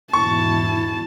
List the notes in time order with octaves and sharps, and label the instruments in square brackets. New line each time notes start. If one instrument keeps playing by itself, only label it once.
[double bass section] E2 G#2 B2 [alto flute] E4 [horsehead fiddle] A5 [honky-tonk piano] C#6